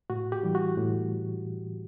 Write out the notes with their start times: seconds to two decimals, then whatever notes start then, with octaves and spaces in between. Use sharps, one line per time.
0.10 A2 F#4
0.32 G4
0.43 E3 G3
0.55 F#4
0.77 A2